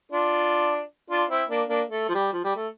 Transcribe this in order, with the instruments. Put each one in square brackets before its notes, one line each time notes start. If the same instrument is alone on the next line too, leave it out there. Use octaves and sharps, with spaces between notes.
[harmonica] D4 F4
D4 F4
C4 E4
A#3 D4
A#3 D4
A3
F3
G3
F3
G3
A3